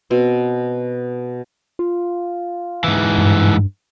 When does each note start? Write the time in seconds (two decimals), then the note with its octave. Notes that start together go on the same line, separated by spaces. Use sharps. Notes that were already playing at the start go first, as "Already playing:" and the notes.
0.10 B2 C4
1.79 F4
2.84 G#2 E3
3.18 G2